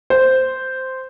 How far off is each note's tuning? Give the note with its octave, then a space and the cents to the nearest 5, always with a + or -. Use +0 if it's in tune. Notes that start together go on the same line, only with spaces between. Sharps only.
C5 -5